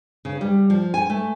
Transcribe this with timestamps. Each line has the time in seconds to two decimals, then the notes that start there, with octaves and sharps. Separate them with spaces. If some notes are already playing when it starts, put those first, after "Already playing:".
0.25 C#3
0.41 G3
0.70 F3
0.94 G#5
1.10 A3